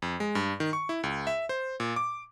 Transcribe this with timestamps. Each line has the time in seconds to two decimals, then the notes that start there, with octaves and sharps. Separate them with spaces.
0.02 F2
0.20 G#3
0.35 G2
0.60 D#3
0.73 C#6
0.89 E4
1.03 C#2
1.27 E5
1.49 C5
1.80 A#2
1.96 D6